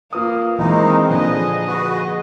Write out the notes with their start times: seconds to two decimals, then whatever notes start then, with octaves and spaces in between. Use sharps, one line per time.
0.13 A#3 F4 B4 D#6
0.59 D#3 E3 G#3 A#3 C4 D#4
1.09 A#2 D3 F3 G#4 B4 D#5
1.67 F#4 B4